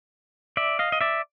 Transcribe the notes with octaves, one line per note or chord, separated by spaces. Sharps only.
D5 E5
D#5 F5
D#5
D5 E5